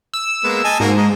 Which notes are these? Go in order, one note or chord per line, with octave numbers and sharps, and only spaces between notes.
E6
G#3 A#3 B3
D#5 G#5 A5
G#2 A#3 F#4
G#3 D#4